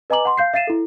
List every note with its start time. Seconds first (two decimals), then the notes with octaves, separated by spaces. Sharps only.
0.10 B4 D#5 G#5 A#5 D6 F#7
0.25 F#5 C6
0.37 F5 G6 C7
0.54 E5 F5 A6 C7 D#7 E7
0.67 E4 A4